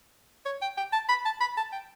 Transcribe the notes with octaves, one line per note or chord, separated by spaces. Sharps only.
C#5
G5
G5
A5
B5
A5
B5
A5
G5